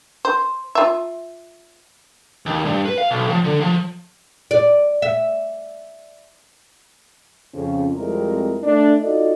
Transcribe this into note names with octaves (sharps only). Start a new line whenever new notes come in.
C5
F4 E5
D#2
G2
B4
F5
B1
F3
D3
F3
D5
E5
F2 C#3
F2 G3 G#3 C4 E4 A#4
A3 D4
D#4 F4 F#4 A4 D5 D#5